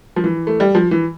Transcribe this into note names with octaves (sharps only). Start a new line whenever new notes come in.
F3
E3
A3
G3
F3
E3